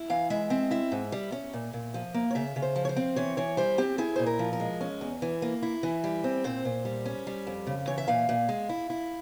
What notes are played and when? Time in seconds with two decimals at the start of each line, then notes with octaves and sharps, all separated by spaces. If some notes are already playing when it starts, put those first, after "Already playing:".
Already playing: E4
0.10 E3 F5
0.30 G#3 E5
0.50 C4 E5
0.71 E4 E5
0.92 G#2
1.12 G3
1.32 C#4
1.53 A#2
1.73 A#2
1.94 F3
2.14 A#3
2.31 C#5
2.35 C#3 E5
2.56 C#3
2.62 C5
2.76 F3
2.85 C#5
2.89 C5
2.96 C4
3.16 E3 C#5
3.37 E3 C#5
3.57 G3 C5
3.78 C4 G4
3.98 E4 G#4
4.16 A#2 C5
4.26 A#4
4.39 F3
4.53 A#4
4.60 G#3
4.81 C#4
5.01 E2
5.22 E3
5.42 A#3
5.63 E4
5.83 E3
6.04 G3
6.24 C4
6.44 A#2 C5
6.65 A#2
6.85 G3
7.05 C#4
7.27 G3
7.47 F2
7.67 C#3
7.87 E3 C#5
7.98 E5
8.08 A#2 F5
8.29 A#2
8.49 G#3
8.69 E4
8.90 E4